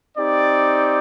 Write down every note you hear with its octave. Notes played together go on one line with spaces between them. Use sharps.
C4 D#4 G4 D5